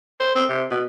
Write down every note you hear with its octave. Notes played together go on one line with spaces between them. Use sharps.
C5
C4
C3
B2